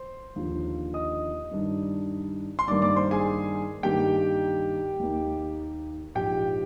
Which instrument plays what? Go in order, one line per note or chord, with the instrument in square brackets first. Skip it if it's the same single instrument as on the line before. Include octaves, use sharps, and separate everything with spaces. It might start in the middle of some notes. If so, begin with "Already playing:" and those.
Already playing: [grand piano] C5 C6
D#2 D3 F3
D#5 D#6
G2 D#3 G3 D4
C6
G2 D#3 G3 A#3 D5 D6
D5 D6
C5 C6
G#4 G#5
G2 D#3 A#3 G4 G5
D#2 D#3 A#3 D#4
A#1 G#2 F3 G4 G5